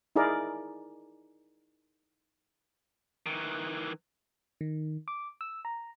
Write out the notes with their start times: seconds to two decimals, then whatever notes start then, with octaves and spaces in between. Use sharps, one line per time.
0.16 D#4 E4 G#4 A#4 D5
3.26 D#3 E3
4.61 D#3
5.08 D6
5.41 E6
5.65 A#5